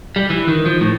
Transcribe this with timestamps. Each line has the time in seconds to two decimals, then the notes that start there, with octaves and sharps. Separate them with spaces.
0.16 G3
0.30 E3
0.48 D#3
0.66 F3
0.81 A2